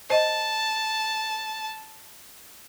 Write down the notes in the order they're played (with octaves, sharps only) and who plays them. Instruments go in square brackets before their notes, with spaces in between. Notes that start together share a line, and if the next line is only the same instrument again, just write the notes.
[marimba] C5 D#5 [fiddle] A5